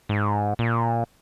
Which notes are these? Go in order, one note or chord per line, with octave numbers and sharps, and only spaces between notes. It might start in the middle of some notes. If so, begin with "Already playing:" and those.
G#2
A#2